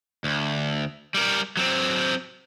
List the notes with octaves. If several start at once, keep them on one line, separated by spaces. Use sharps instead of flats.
D2
G3 A#4
F#3 C4